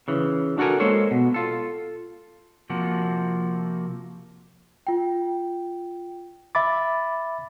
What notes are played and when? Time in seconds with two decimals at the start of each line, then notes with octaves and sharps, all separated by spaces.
0.08 C#3 E3
0.58 D4 F#4 A4 A#4 G#5
0.80 G#3 A#3 A4 C5 C#5
1.11 B2
1.34 F4 A4
2.70 C3 F3 A#3 F#4
4.87 F4 G5
6.55 E5 B5 D6 A6